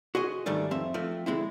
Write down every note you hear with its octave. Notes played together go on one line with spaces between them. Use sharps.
F#4 G#4 C5 D#5
G#2 D#3 G3 A3 D4
F2 C4 E5
F3 A3 C4
D3 G#3 C4 E4